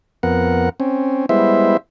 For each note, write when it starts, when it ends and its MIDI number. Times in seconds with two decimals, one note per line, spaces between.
0.23 0.69 41
0.23 0.69 59
0.23 0.69 70
0.23 0.69 78
0.80 1.26 60
0.80 1.26 61
1.29 1.77 55
1.29 1.77 56
1.29 1.77 59
1.29 1.77 64
1.29 1.77 72
1.29 1.77 76